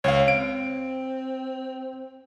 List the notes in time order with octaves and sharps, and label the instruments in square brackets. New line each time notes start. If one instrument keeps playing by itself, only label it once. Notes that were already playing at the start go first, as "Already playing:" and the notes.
[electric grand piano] C#2 F5 [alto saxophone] C#5
[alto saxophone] C4 [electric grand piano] D7